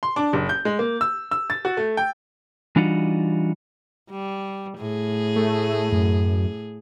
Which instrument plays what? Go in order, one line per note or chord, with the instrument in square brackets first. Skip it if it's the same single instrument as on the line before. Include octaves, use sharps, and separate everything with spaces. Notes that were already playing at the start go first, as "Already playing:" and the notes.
[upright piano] C6
D4
F#1
G6
G#3
A#3
E6
E6
A6
F#4
A3
G5
[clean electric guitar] E3 G3 D4 D#4 F4 F#4
[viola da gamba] G3
A2 G#4
[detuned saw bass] A3
F#2